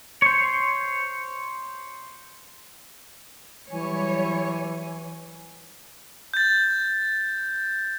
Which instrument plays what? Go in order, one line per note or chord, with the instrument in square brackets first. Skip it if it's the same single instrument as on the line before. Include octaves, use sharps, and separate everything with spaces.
[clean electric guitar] C5 C#5
[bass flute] E3 [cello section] F#3 G3 C#5 [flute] G#5
[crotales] G6 A6